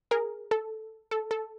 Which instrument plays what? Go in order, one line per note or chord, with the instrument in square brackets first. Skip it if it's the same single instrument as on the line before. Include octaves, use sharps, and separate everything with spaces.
[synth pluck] G#4 A#4
A4
A4
A4